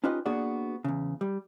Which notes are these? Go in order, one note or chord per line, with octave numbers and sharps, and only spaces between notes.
C#4 D#4 F4 G4 B4 D#5
A#3 B3 D4 F#4 G#4 D5
E2 C#3
G3